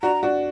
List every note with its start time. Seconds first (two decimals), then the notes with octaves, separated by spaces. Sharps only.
0.02 D4 F#4 A#5
0.23 D4 F#4